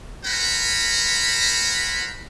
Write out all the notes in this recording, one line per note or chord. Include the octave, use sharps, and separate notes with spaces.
A#4 C5 F#5 G#5 B5